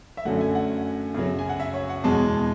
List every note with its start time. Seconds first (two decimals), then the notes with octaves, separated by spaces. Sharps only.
0.17 E5
0.25 F#2 D3 F#3 A3 F#5
0.41 G#5
0.55 F#5
1.14 F#2 C#3 F#3
1.39 G#5
1.49 F#5
1.60 E5
1.73 C#5
1.89 F#5
2.04 E2 B2 G#3 A5